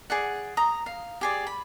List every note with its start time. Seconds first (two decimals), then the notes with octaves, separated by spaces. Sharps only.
0.10 G#4 D5 F#5
0.57 A#5 D#6
0.86 F5
1.21 G4 G#4 D5
1.47 B5